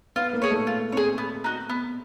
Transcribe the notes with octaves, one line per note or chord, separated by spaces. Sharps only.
B3 F4
A#3
G#4 C#5
A3
F4
C4 G#4 C#5
B3
D#4 F#4
B3